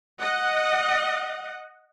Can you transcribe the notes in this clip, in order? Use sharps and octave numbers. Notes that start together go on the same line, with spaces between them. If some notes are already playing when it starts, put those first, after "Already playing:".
D#5 F#5